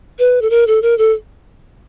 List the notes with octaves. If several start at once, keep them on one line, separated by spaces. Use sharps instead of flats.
B4
A4
A#4
A4
A#4
A4